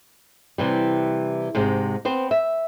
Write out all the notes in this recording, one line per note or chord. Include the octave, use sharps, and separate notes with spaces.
C3 E3 G3
G#2 C3 G#3
B3 C4 C5
E5